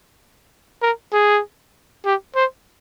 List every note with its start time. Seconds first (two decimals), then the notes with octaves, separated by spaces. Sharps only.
0.82 A#4
1.13 G#4
2.05 G4
2.36 C5